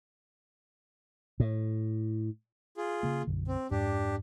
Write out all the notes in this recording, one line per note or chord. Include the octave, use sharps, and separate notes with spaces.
A2
F4 G#4
C#3 A#3
B1 F#2 D3
C4
F2 G#2 D4 G4